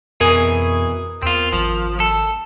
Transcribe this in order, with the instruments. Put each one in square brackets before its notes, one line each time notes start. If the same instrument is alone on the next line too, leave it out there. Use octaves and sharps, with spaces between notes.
[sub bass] F2 [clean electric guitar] B2 E3 G#4 [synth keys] A#4 D#6
[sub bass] E2 [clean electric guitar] C4 F4
[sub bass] G#1 [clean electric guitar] F3
[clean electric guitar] A4